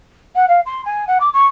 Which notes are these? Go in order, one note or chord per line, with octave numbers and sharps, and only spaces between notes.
F#5
F5
C6
G#5
F#5
D6
C#6